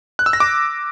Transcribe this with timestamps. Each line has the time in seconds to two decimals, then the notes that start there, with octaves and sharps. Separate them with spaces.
0.19 F#6
0.26 E6
0.33 A#6
0.40 D6